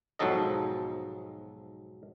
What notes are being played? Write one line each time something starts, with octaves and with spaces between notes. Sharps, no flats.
B1 G#2 F3 F#3 A4 D#5